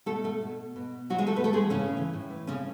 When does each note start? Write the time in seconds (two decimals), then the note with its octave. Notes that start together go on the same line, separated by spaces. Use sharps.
0.06 B2 A3 A4
0.24 A3 A4
0.41 B2
0.76 B2
1.10 B2 F#3 F#4
1.18 G#3 G#4
1.27 A3 A4
1.36 B3 B4
1.44 A2 A3 A4
1.53 G#3 G#4
1.62 E3
1.70 C#3 C#4
1.79 A2
1.97 E3
2.13 A2
2.30 E3
2.47 A2 C#3 C#4